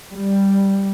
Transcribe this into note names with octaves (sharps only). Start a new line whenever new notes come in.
G3